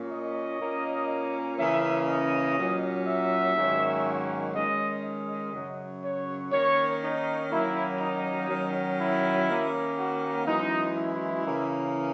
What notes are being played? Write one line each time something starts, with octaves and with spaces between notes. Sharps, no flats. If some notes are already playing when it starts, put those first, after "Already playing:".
Already playing: A#2 A#3 C#4
D#5
A#2 A#3 C#4
C#3 E3 A#3 C#4 E5
D#5
A#2 F#3 C#4
E5
G#2 D#3 F#3 A#3 C#4
D#3 G#3 C#4 D#5
D#5
F#2 C#3 F#3
C#5
D#3 A#3 C#4 C#5
D#4
D#3 F#3 A#3 C#4 E4
D#4
D#3 F#3 C#4
E4
D#3 A#3 C#4
F#4
F#2 E3 G#3 D#4
E4
C#3 E3 A#3 C#4